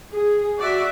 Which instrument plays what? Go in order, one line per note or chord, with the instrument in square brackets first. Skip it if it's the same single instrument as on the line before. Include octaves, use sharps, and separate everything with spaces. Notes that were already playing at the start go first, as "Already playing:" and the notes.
[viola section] G#4
F#4 D5 E5